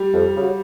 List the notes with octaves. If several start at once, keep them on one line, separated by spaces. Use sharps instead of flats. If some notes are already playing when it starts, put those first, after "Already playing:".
Already playing: G3
F2
C#3 F#3